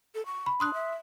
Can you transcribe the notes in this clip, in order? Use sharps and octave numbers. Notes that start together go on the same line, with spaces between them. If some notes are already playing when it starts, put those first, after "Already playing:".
A4
C#6
B5
D4 C6 D#6 F#6
E5